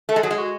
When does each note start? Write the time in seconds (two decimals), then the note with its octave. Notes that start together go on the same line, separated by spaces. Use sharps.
0.09 A3 A4
0.16 G#3
0.23 F#3 G#4
0.31 G#3
0.38 F#4